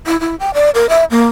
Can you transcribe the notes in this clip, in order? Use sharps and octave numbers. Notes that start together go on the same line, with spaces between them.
E4
E4
G5
D5
A#4
E5
A#3